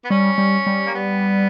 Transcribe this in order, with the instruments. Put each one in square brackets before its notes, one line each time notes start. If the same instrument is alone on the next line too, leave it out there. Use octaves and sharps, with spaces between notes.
[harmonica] B3
[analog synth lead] G3 [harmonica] C#4
[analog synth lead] G3
G3
[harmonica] A#3
B3